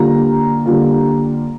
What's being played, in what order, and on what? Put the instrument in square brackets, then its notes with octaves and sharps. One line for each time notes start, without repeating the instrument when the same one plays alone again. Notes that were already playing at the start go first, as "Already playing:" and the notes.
Already playing: [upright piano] D3 G3 A#3 F4 A#5
D3 G3 A#3 F4